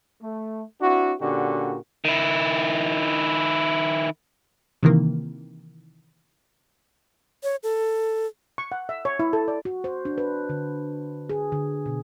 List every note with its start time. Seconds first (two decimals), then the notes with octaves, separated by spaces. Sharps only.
0.22 A3
0.81 C4 D4 E4 F#4
1.20 A#2 D3 C#4 F#4 G4
2.05 D#3 E4
4.83 C3 D#3 E3 A#3
7.43 C#5
7.63 A4
8.58 C#6
8.72 F#5
8.89 E5
9.05 C#5
9.19 E4
9.33 A4
9.48 D5
9.65 F#4
9.84 C5
10.05 D4
10.18 B4
10.49 D3
11.30 G#4
11.52 D3
11.86 B2